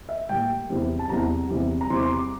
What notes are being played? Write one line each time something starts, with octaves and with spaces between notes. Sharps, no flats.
E5
A2 G3 A#3 G5
E2 C3 E3 G3 C4
A5
E2 C3 E3 G3 C4 A#5
E2 C3 E3 G3 C4
A#5
E2 C3 E3 G3 C4 C6
D6
C6
D6